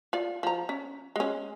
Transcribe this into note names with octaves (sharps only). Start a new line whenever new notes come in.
F4 D5
F3 A#5
C#4
G#3 C#4